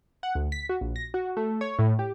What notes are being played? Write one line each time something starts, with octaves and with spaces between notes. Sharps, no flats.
F#5
D2
B6
F#4
A#1
A#6
F#4
A3
C#5
A2
G4